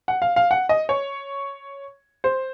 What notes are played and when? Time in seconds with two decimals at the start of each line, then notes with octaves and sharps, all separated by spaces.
0.08 F#5
0.22 F5
0.36 F5
0.51 F#5
0.69 D#5
0.89 C#5
2.24 C5